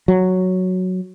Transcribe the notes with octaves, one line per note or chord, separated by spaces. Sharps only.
F#3